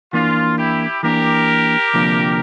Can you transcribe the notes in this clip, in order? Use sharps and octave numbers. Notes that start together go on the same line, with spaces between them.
E3 A#3 D4 F4
E4 G4
E3 A#3 D4 G4 A#4
D2 C3 F3 A#3 D4